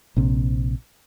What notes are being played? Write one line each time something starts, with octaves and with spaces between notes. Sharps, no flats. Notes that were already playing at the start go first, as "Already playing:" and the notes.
A#1 C3